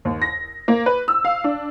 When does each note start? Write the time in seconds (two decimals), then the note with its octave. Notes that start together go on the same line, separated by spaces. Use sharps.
0.05 D#2
0.22 A#6
0.68 A#3
0.86 B4
1.08 E6
1.25 F5
1.44 D4